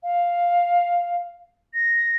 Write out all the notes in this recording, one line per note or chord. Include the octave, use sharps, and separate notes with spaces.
F5
A#6